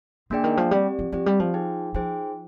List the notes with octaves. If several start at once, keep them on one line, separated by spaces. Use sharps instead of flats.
D3 A#3 D4 G#4 D5 G5
D#3
F3
G3 C4 G4 D5
F3
F3 C4 G4 D5
G3
F3
D#4 G#4 C5 G5
F3 D#4 G#4 C5 G5